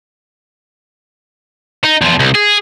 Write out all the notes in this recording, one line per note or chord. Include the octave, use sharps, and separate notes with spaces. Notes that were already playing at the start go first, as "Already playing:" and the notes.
D#4
E2 F3
C2
G#4